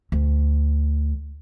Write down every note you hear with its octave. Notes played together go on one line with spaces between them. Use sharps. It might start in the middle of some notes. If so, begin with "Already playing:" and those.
D2